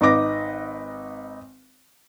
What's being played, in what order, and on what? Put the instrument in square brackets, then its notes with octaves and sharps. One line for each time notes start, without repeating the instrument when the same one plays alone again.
[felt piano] G#1 D#4 B4 D6 A#6